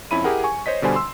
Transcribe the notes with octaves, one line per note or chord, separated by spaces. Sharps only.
F2 C#4 E4 B5 D#7
E4 G4 G#4 A#4 F#5
G#5 C#6
C5 C#5 D#5 B6
B2 D3 G3 C5 G#5
C6 E6